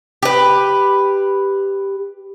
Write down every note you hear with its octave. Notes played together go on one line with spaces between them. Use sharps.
G4 B4